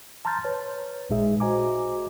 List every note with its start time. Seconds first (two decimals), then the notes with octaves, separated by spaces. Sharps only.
0.25 A5 A#5 C6 F6 G6 A6
0.45 B4 C#5
1.10 A1 A#2 G#3 D#4 G#4 E5
1.40 F#4 C5 D#5 G#5 A#5 D6